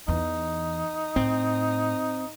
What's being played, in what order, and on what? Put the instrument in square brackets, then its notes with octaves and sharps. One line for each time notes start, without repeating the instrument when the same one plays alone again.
[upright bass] E2 [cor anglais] D#4
[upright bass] A2 [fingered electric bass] C4